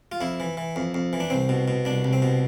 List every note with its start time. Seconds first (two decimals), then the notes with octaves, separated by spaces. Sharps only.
0.12 F4
0.21 F2 E4
0.40 E3
0.57 E3
0.76 F2
0.94 F2
1.13 E3
1.20 D4
1.30 C2 C4
1.49 B2
1.68 B2
1.85 C2 D4
2.04 C2
2.13 C4
2.22 B2